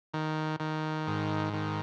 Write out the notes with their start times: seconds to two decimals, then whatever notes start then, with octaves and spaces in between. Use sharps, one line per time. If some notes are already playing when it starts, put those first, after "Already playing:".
0.14 D#3
0.60 D#3
1.07 G#2
1.53 D#3